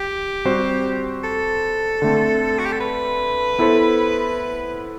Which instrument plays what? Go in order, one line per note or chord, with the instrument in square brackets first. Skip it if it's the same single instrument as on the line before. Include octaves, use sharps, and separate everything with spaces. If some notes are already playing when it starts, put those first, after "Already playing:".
Already playing: [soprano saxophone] G4
[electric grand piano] G3 C4 F#4 C5
[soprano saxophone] A4
[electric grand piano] D3 A3 C4
[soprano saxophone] F#4
G4
A4
B4
[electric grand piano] B3 E4 A4 C5